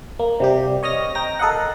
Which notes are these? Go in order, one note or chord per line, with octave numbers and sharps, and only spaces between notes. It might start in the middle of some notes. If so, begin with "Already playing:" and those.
A#3
C3 G3 G4
C#5 D#5 F6 A#6
G5 A#5 A#6
A4 A#4 D#5 F5 F#5